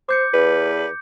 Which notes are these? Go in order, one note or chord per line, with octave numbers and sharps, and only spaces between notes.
C5 D6 G6 C#7
E2 B4